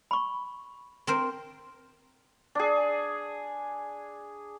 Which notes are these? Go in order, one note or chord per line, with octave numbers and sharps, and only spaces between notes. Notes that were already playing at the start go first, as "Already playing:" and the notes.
B5 C#6
C4 A#4 C5
D4 G#4